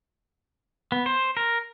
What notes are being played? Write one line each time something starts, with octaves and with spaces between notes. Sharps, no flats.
B3
C5
A#4